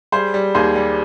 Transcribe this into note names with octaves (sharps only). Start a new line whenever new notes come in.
G3 G#4 C5
G3
D#2 G#4 C5
G3